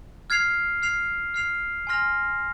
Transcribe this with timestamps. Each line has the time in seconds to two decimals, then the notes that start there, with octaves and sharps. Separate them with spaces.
0.30 F6 G#6 C7 F7
0.82 F6 G#6 C7 F7
1.34 F6 G#6 C7 F7
1.87 G#5 C6 F6 A#6 F7